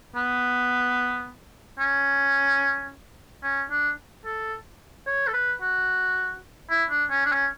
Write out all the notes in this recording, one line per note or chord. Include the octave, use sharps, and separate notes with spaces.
B3
C#4
C#4
D4
A4
C#5
A4
B4
F#4
E4
D4
C#4
D4
C#4